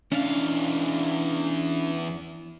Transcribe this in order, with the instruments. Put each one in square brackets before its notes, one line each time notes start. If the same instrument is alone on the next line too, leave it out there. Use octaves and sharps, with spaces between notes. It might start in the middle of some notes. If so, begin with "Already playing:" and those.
[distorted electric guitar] E2 F5 [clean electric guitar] C#4 D4